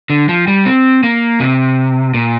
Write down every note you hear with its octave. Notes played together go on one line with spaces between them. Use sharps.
D3
F3
G3
C4
A#3
C3
A#2